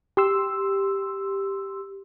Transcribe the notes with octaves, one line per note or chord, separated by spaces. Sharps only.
G4 C6 E6